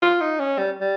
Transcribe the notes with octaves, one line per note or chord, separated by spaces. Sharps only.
F4
D#4
C#4
G3
G3